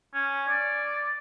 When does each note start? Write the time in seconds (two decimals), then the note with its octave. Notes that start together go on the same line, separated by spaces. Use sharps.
0.14 C#4
0.48 D5